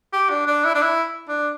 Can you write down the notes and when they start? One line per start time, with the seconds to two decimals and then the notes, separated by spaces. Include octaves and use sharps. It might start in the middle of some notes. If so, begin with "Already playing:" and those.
0.13 G4
0.30 D4
0.47 D4
0.65 E4
0.75 D4
0.82 E4
1.28 D4